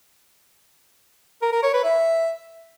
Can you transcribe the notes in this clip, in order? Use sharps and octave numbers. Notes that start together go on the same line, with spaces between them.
A#4
A#4
C#5
B4
E5